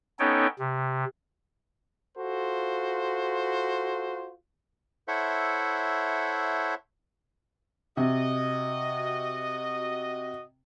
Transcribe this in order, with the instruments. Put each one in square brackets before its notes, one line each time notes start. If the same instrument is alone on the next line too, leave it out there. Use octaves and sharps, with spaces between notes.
[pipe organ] B3 C#4 D#4 A4 C#5 G5
C3
[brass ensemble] F4 F#4 A4 C5
[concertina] E4 A4 C5 C#5 E5 F#5
[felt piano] C3 [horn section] F#4 D#5